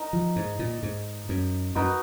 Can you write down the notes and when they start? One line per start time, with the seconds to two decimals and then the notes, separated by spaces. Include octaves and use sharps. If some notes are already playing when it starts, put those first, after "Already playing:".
Already playing: D#4 A#4 D#5
0.13 F3
0.36 G#2
0.59 A#2
0.83 G#2
1.29 F#2
1.75 F#2 D#4 F#4 B4